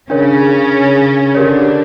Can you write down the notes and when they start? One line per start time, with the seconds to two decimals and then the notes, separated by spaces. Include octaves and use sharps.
0.10 C#3 C#4 D4 A#4 C#5
1.35 D3 D4 G4 A#4 C#5